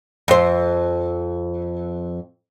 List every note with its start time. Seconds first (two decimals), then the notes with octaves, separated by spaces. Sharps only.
0.28 F2 C5